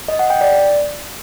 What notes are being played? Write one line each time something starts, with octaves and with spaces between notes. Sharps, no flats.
D#5
F#5
G5
D5